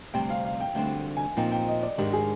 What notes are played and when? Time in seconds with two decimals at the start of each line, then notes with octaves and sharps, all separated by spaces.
0.14 D2 C3 G3 C4 G5
0.30 F5
0.45 F5
0.60 G5
0.75 D2 D3 G3 C4 G5
1.17 G#5
1.37 A#2 F3 C4 D#4 G5
1.51 G5
1.68 D#5
1.83 D5
1.98 G#2 D#3 G#3 D4 G4
2.13 G#4